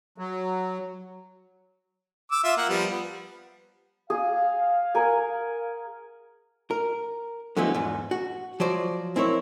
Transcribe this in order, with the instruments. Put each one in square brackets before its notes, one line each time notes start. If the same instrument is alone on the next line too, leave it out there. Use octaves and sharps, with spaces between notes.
[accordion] F#3
[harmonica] D6 E6
F4 E5
A#3 F#5
F3 G3 B3
B3
[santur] G#4 [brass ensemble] F5
[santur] A#4 F#5 G#5
[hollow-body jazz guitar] A#4
D3 F3 F#3 G#3 B3 E4
E2 G#2
F#4
F3 F#3 C5 D5
C4 E4 A#4 C#5